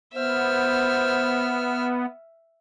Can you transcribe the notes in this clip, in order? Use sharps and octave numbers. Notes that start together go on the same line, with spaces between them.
B3 C5 E5 F6